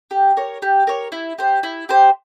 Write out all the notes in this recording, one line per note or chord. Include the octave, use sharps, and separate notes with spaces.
G4
A#4 C#5
G4
A#4 C#5
E4
G4 C5
E4
G4 C5